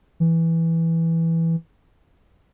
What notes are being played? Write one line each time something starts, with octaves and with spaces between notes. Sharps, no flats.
E3